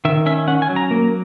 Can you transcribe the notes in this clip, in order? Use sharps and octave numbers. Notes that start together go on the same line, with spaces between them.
D#3 E5
C#4 E5
C#4 F#5
G#5
F#3
A#5
A#3